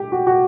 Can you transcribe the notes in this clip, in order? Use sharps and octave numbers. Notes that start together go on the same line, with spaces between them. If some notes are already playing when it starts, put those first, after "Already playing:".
Already playing: G4
F#4
F#4